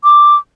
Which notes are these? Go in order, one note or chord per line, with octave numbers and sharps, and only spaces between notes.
D6